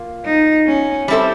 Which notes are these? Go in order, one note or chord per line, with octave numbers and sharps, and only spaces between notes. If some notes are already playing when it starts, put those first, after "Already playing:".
Already playing: A#3 F4
D#4
C#4
G3 C4 E4 A4 C5